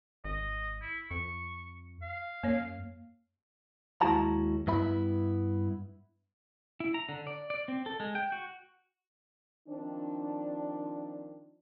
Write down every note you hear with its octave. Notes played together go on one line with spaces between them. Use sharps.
G#1 D#5
E4
F2 C#6
F5
F#2 A#3 C#5
D#2 G#3 E4 F#4 A5 A#5
G2 B3 E4 B5
E4
A#5
D3
D5
D5
C4
A4
G#3
G5
F#4
D#3 F3 C4 D4